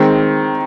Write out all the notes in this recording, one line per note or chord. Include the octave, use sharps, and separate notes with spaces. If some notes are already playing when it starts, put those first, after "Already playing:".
Already playing: D#3 G#3 C4